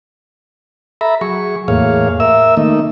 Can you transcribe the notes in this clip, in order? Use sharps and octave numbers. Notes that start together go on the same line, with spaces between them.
A4 E5 A#5 B5
F#3 G#4 C#6
E2 A2 A#3 G#4 C#5 F5
A#4 E5 E6
D#3 A3 A#3 D#4